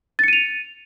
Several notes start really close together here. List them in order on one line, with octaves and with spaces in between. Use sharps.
A6 C#7 D#7 F7